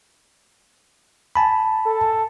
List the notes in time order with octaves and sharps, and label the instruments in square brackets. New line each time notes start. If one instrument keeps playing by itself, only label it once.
[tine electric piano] G#5 A5 B5
[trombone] A4